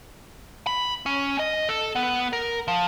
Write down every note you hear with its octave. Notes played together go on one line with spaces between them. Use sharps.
B5
C#4
D#5
A4
B3
A#4
F3